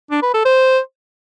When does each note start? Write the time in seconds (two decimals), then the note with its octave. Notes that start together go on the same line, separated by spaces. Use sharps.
0.11 D4
0.22 B4
0.34 A4
0.45 C5